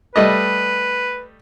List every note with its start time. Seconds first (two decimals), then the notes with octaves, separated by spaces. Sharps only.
0.16 G3 A3 B4 D#5